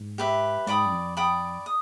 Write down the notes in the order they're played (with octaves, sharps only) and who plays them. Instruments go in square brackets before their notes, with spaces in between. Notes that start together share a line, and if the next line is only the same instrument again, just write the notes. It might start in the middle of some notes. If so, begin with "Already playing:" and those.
Already playing: [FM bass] G#2
[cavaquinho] G4 B4 E5
[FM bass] G#2 [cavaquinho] D5 G5 B5 D#6
[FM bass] F#2
F2
[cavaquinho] D5 G5 B5 D#6
D#6